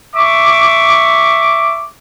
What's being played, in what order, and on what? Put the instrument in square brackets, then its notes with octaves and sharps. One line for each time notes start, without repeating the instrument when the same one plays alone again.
[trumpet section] E5 C#6 D6